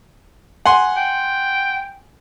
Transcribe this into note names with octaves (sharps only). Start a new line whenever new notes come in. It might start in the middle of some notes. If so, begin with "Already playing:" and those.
F#5 G#5 C6
G5